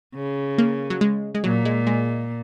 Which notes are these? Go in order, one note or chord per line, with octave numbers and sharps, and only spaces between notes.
C#3
A#3
F#3
G#3
G#3
A#2 F#3
G#3
G#3